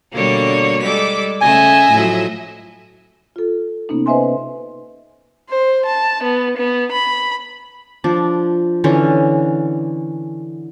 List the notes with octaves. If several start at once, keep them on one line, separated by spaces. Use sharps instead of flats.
B2 D3 G3 A#3 C#5
G3 G#3 A4 D6 B6
C#3 A3 D#5 E5 G#5
A2 F3 F#3
F4 A4
C3 A#3 B3 C#4 D#4
B4 C5 D#5 E5 G#5 C6
C5
A5
B3
B3
B5
F3 D4 D5
D3 E3 C#4